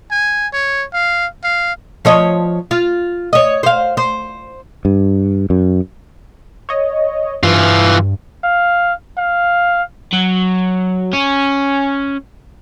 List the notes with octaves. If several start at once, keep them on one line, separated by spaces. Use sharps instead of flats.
G#5
C#5
F5
F5
F3 C#5 D#5
F4
C#5 D#5
C5 F5
C5
G2
F#2
C#5 D#5
G2 E3 F4
F5
F5
F#3
C#4